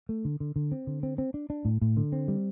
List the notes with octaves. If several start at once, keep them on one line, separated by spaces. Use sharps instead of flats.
A3
D3
D3
D3
C4
D3
C4
C4
D4
D4
A2
A2
D3
C4
G3